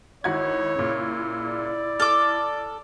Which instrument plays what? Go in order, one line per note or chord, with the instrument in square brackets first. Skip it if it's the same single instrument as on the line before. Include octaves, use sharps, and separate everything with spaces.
[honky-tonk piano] G#1 F#4 G#6 [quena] E4 [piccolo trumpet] C#5
[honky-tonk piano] A#2 C#3
[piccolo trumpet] D5
[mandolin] A4 D6 [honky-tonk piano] F6